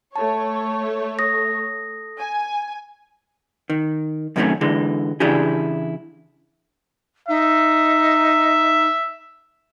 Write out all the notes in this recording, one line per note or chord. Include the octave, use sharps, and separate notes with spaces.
A3 C#5 A5
A4 D#6 A#6
G#5
D#3
F#2 C3 D#3 G#3 A3 C#4
D3 E3 G#3
C#3 E3 D4 E4 G4 G#4
D#4 E5